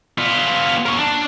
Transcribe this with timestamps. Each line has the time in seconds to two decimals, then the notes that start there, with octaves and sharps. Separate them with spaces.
0.18 B3 F4
0.86 A#4 C#5
0.99 D4